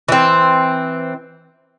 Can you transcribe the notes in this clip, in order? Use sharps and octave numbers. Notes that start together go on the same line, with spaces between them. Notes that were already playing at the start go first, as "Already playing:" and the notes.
E3 C4